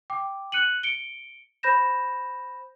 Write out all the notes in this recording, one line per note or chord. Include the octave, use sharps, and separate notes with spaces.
G5 D6
F#6 C#7 D#7 F#7
C#7 D7 G7
C5 B5 G6 A#6 E7